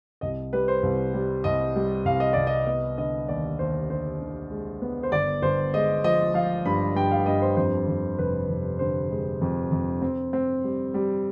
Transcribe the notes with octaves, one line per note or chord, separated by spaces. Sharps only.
C2 D#5
G3 B4
C5
C2
G3
C2 D#5
G3
C2 F5
D#5
C2 D5
D#5
B3 D#5
D3 D#5
D#2 D5
D#2 C5
D3 C5
D3
G#3
B3
C5
G1 D5
G1 C5
G#3 D#5
F3 D#5
F3 F5
G2 B5
G2 G5
F5
G2 D#5
C5
F2 C5
F2
F1 B4
F1
D3 C5
G#3
F2
F2
C4
C4
G3
G3